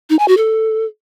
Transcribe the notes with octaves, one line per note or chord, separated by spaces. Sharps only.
D#4
G#5
F#4
A4